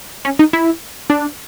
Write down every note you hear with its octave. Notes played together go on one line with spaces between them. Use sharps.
C#4
D#4
E4
D4